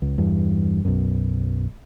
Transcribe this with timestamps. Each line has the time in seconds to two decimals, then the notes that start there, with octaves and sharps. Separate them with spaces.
0.02 C#2
0.18 E2 G2
0.85 B1 F#2